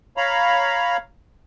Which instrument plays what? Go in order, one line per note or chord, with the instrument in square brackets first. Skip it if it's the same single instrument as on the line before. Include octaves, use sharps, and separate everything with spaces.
[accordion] C#5 F5 A#5 B5